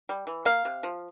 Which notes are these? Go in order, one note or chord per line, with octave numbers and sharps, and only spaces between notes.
G3
E3
A#3 F5
C3
F3